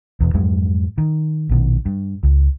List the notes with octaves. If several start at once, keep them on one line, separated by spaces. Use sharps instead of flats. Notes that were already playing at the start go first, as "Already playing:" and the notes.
E1 E2
F2 G#2 F#3 G#3
D#3
A#1 B2 D#3
G2
C#2